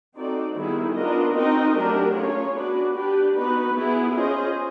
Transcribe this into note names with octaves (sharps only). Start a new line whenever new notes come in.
C4 D#4 F#4 A4 D5
D#3 G3 B3 E4 G#4
B3 D4 F4 A#4 D#5
C4 D#4 F#4 A#4 D#5
F#3 A3 D4 G4 A#4
A3 C#4 F4 G#4 C#5
B3 D4 F#4 B4 D5
D4 G4 B4 D5
B3 D#4 F#4 B4
B3 E4 G#4
C#4 F4 G#4 C5 D#5